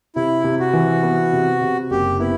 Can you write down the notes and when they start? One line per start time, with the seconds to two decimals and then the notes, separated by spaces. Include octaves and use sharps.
0.16 C3 E4
0.44 C3
0.59 F#4
0.73 E3
1.03 B3
1.33 C3
1.62 C3
1.90 F#1 G4
2.19 B3 E4